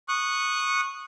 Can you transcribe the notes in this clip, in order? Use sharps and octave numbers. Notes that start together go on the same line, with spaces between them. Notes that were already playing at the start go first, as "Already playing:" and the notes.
C#6 D#6 F#6